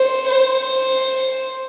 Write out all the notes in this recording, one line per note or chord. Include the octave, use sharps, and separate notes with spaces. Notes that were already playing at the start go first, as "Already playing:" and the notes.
Already playing: C5
C5